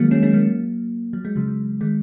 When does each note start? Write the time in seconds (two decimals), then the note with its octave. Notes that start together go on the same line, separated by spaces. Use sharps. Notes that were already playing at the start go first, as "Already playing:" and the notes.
Already playing: D#3 F#3 G#3 A#3
0.11 G#3 C#4
0.23 G#3 C#4
0.33 F#3 A#3
1.13 F#3
1.25 G#3
1.36 C#3 F#3
1.80 D#3 G#3